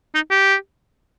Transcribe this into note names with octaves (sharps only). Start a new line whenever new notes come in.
D#4
G4